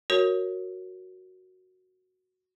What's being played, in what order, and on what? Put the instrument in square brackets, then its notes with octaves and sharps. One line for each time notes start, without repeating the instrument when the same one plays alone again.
[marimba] F#4 A#4 C#5